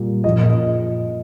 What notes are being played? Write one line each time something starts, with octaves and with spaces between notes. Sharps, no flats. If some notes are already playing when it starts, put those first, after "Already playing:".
Already playing: A#2 G3
A#2 F3 D#5
D#5